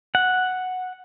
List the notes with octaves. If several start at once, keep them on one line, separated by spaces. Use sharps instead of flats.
F#5